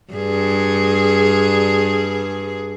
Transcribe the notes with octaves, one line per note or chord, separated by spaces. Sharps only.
G2 G#4